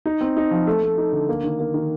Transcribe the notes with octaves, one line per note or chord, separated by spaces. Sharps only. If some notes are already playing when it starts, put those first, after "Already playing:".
D#4
C4
D#4
F3
A3
A3
D#4
D3
A#3
D#3
A#3
D#3